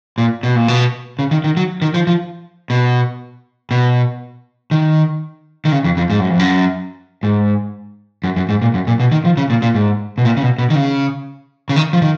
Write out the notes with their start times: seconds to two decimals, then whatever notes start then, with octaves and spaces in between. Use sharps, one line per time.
0.18 A#2
0.43 B2
0.56 A#2
0.68 B2
1.19 C#3
1.31 D#3
1.44 D#3
1.57 F#3
1.82 D#3
1.94 F3
2.07 F3
2.70 B2
3.71 B2
4.71 D#3
5.65 D#3
5.72 C#3
5.84 F2
5.97 F2
6.10 G#2
6.20 F#2
6.30 F2
6.39 F#2
7.23 G#2
8.24 F#2
8.36 F#2
8.49 G#2
8.62 A#2
8.74 F#2
8.87 A#2
9.00 B2
9.12 D#3
9.25 F3
9.37 C#3
9.50 A#2
9.62 A#2
9.75 G#2
10.18 B2
10.25 A#2
10.37 C#3
10.43 B2
10.58 B2
10.70 D#3
10.75 C#3
11.69 C#3
11.76 D#3
11.93 F3
12.02 D#3